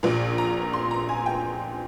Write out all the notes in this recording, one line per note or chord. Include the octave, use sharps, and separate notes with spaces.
A#1 A#2
A#5
C6
A#5
G#5
G5